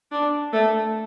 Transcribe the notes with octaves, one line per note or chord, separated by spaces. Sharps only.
D4
A3